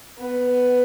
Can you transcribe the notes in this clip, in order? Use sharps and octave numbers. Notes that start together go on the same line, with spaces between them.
B3